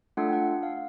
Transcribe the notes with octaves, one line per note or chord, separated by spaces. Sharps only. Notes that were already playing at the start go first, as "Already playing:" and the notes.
A3 D4 F4 A4 F#5
G5
F#5
F#5
F5